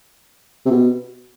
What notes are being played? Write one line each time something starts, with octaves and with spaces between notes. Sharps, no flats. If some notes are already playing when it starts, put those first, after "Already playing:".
C3
B2